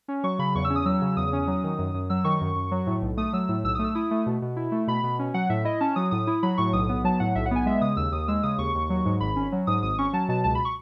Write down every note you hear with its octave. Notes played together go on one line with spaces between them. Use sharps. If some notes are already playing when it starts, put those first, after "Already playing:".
C#4
F#3 C#6
C#3 B5
E2 C#6
E6
C#4
D#6
F#3 E6
C#3
E2 D#6
C#4
F#3
D#3
F#2
F#2
F#3 E6
D#3 C#6
F#2
F#2
F#3
A2
B1
A3 D#6
F#3 E6
A2
B1 E6
A3 D#6
E6
E4 D#6
A3
B2
B2
E4
A3
B2 B5
B2
C#4
F#3 F#5
A2 E5
E4 D#5
C#4 A5
F#3 D#6
A2 D#6
E4
F#3 B5
A2 C#6
B1 D#6
B3
F#3 A5
A2 F#5
B1 E5
F#5
B3 G#5
G#3 E5
C#3 D#6
D#2 E6
D#2 D#6
G#3 E6
C#3 D#6
D#2 C#6
D#2
F#3
G#2
G#1 B5
C#4
F#3
G#2 D#6
G#1 D#6
C#4 C#6
F#3 A5
B2 A5
C#2 A5
B5
C#6